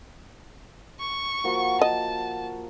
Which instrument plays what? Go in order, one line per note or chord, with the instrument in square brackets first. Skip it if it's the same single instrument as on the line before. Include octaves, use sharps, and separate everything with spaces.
[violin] C#6
[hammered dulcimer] F3 A#3 F#4
[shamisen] D#5 [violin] A5